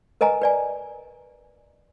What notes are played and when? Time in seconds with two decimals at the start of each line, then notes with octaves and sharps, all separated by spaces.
0.21 A#4 B4 D#5 G#5 A#5
0.42 B4 D5 G#5